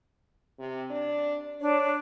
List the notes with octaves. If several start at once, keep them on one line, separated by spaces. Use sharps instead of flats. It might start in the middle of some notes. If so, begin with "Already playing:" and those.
C3
D4
D4 C#5